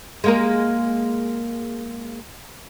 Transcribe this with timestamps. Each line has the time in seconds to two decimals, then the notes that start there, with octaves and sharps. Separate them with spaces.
0.24 G#3 A#3 A#4